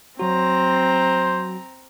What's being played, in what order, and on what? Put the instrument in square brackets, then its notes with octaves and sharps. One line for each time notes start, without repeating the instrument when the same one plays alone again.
[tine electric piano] F#3 F#4 [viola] C4 A#5 [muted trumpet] C5